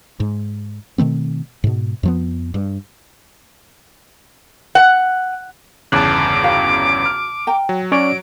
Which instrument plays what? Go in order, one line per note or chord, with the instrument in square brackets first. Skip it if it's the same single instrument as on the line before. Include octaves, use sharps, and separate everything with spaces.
[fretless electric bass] G#2
B2 D#3 A3 C4
G#2 B2
F2 F3 B3
G2
[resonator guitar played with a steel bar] F#5
[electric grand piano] G1 E2 C#3 [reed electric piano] A5 F#6 [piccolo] D6
[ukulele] F#4 F5 G5
[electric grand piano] F6
[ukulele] G5 A#5
[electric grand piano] F#3
[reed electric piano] C#4 C#5 D5 [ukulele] F#4 [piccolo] D7